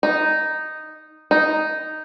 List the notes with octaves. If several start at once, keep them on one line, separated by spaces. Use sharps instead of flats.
D#4
D#4